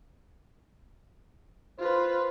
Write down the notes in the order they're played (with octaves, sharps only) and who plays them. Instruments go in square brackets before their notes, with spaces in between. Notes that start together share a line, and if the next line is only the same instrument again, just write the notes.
[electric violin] F4 B4 [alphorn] C5